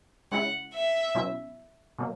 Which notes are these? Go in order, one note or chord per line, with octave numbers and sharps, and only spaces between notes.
C#3 G#3 C#4 E4 F#5
E5
B2 F#3 C#4 E4
B2 F#3 A#3